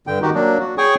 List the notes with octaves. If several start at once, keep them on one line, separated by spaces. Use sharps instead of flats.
G2 D3 G5
D#3 D#4 F#4 G4
F#3 A#3 D4
F#4
G#4 C#5 G5 G#5 C#6 D#6